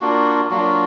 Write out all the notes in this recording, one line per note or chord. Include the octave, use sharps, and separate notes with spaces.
A#3 D4 F4 F#4
F#3 A#3 D4 F4 F#4